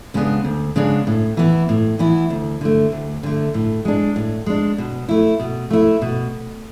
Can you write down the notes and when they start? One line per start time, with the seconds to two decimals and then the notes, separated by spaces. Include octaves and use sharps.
0.14 C#3 G#3 B3 D4
0.45 D2
0.76 C#3 G#3 B3 D4
1.07 A2
1.37 E3 B3 E4
1.69 A2
1.99 E3 B3 E4
2.30 D2
2.61 D3 A3
2.92 D2
3.23 D3 A3
3.54 A2
3.85 G#3 D4
4.16 A2
4.46 G#3 D4
4.78 B2
5.09 A3 E4
5.40 B2
5.71 A3 E4
6.02 B2